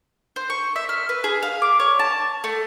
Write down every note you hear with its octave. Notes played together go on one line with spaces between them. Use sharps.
C5
C#6
E5
F6
B4
G#4
F5
D6
C#5
A5
A3